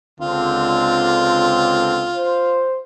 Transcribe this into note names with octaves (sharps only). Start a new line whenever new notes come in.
C#2 D3 C4 F4
C5